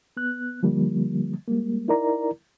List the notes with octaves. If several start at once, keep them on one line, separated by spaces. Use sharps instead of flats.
B3 F#6
D3 F3 G3 A#3
G3 G#3 A#3
D#4 E4 A#4 D5 A#5